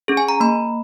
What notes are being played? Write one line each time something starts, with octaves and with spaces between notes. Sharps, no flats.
C#4 G#4
G#5
A#5
A#3 B5